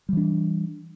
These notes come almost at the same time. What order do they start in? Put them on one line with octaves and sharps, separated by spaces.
G3 E3 D4